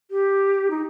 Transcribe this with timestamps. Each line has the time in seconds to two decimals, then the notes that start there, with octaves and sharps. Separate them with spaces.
0.11 G4
0.70 D#4